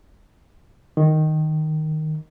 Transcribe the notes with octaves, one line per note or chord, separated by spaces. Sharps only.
D#3